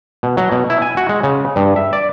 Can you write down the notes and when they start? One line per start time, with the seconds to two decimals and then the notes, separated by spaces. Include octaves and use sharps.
0.23 B2
0.37 F#3
0.52 B2
0.70 E4
0.82 G#5
0.97 F#4
1.09 G#3
1.23 C#3
1.56 G2
1.76 E5
1.93 D5